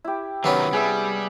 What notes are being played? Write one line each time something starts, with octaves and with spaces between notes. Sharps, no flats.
E4 G4
C3 D#3 F#3 B3 C#4
G3 G#4 B4 E5